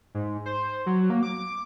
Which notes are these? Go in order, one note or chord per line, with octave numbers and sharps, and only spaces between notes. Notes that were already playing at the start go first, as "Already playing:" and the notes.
G#2
C5
F#3
A#3
D6